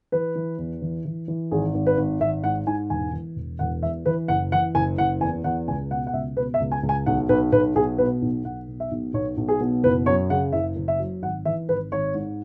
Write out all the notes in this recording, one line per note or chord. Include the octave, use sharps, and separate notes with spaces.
E3 B4
E3
E2
E3
E3
E3
G#1 G#4
G#1
B4
G#1
G#1 E5
G#2 F#5
G#2 G#5
E1 G#5
E3
E1
E1 F#5
E2 E5
E3 B4
F#1 F#5
E3 F#5
F#1 G#5
F#1 F#5
E2 G#5
E2 F#5
C#2 G#5
B2 F#5
F#5
C#2 E5
B2 B4
E5
C#2
G#5
C#2
G#5
B1 F#5
B1 B4
B1 B4
B1 G#4
B2 B4
B1
B1 F#5
B2
E5
B1
B1 C#5
B1
G#4
B2
F#1 B4
F#2 C#5
C#3 F#5
F#1 E5
F#1
E5
F#3
G#1 F#5
E3 E5
G#1 B4
G#1 C#5
G#2